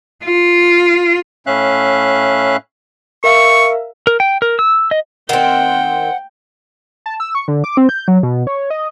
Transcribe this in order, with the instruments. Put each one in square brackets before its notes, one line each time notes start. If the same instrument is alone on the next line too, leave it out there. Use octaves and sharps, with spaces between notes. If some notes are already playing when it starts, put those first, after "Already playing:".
[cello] F4
[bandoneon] A2 C#4 E5 F5 F#6
[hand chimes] A#4 E5 F5 [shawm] C#6
[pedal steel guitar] A#4
G5
A#4
E6
D#5
[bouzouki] D#3 C4 [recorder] F#5 [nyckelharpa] G5
[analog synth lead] A5
E6
C#6
D3
D6
C4
G6
F#3
B2
C#5
D#5